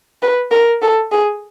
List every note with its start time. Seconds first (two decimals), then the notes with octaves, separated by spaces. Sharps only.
0.22 B4
0.51 A#4
0.82 A4
1.12 G#4